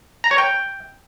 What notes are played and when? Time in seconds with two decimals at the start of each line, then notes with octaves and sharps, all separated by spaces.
0.24 A#5
0.31 C#5
0.38 G5